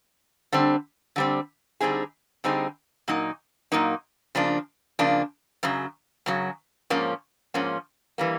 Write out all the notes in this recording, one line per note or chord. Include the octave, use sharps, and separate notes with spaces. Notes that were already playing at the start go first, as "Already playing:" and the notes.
D3 G3 C4
D3 G3 C4
D3 G3 C4 D#4 G#4
D3 G3 C4 D#4 G#4
A#2 F#3 A#3 D#4
A#2 F#3 A#3 D#4
C#3 F3 A#3 D4
C#3 F3 A#3 D4
F#2 C#3 F#3
F#2 C#3 F#3
G#2 F3 A#3 C#4
G#2 F3 A#3 C#4
E3 G3 A#3